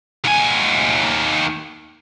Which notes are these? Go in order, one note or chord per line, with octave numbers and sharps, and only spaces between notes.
D#2 G#5